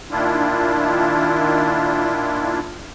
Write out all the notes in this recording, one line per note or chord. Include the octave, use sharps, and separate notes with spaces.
A#2 D#3 D4 E4 F4